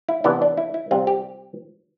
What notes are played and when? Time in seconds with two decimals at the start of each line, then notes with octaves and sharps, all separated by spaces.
0.09 E4
0.24 C3 E3 B3 D4 E4
0.42 D4
0.57 E4
0.74 E4
0.91 C3 G3 C4 F4
1.07 G4